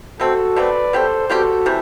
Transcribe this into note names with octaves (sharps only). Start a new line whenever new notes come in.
B2 A3 C4 F#4 A4
B2 A3 C4 B4 D5
B2 G3 C4 G4 A4 C5
B2 G3 C4 F#4 G4 A4
C3 E3 A3